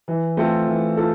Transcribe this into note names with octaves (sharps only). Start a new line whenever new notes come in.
E3
A3 C4 F4 A4
E3
F4 A4